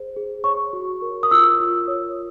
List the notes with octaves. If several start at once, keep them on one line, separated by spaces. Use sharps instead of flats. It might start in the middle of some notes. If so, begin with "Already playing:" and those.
Already playing: G#4 C5
G#4
C#5 C#6
F#4
A#4
D#6
F4 E6
F4
C#5